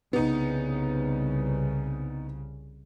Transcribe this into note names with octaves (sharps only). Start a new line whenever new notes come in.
C2 C#3 B3 D#4